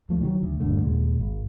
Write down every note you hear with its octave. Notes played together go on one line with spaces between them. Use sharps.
D2 F3 A3
D#3 F3 F#3
D2
D#1 G2 D3 A3
D#2 A#2 G#3
G#1